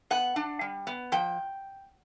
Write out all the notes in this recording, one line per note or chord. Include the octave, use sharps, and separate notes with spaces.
B3 F#5
D4
G3
B3
F3 G5